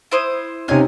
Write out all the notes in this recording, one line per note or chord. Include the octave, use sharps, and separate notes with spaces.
E4 C5 D#6
C3 C#4 D#4 F5 G#5